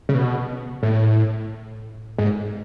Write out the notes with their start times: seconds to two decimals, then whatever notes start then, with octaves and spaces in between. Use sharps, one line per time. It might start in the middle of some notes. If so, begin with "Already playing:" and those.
0.09 C#3
0.15 B2
0.83 A2
2.18 G#2